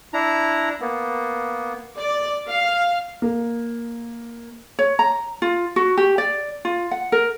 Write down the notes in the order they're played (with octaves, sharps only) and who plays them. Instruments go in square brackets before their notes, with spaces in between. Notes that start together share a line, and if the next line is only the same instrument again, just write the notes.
[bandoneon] D4 E4 A#5
A#3 B3
[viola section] D5
F5
[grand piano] A#3
[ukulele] C#5
A#5
F4
F#4
G4
D5
F4
F#5
A#4